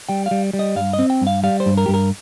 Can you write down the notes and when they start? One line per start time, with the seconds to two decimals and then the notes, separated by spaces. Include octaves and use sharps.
0.09 G3 G5
0.26 F5
0.31 G3
0.53 G3
0.59 D#5
0.76 G2 F5
0.93 D#5
0.99 C4
1.10 G5
1.21 G2
1.27 F5
1.44 G3 F5
1.60 C5
1.66 G2
1.77 A#4
1.86 G2 G4
1.94 A#4